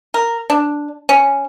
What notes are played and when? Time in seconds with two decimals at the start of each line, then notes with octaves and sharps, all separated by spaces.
0.14 A#4
0.50 D4
1.09 C#4